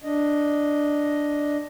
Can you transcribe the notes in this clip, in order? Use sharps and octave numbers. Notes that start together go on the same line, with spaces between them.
D4 D#5